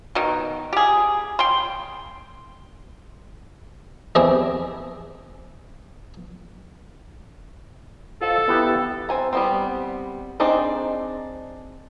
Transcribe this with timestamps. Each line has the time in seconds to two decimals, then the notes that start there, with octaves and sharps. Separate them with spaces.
0.15 B2 D#3
0.73 G4 G#4
1.39 G5 C6
4.15 E2 C4 E4 G4 G#4 D#5
8.21 F4 A4 C5 D#5
8.48 B3 E4 G4
9.09 C4 G#5 A#5
9.33 G3 B3 C4
10.40 C4 D4 D#4 G#4 D5